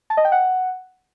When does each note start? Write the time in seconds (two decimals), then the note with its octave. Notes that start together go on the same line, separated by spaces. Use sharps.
0.10 A5
0.17 D#5
0.25 G5
0.32 F#5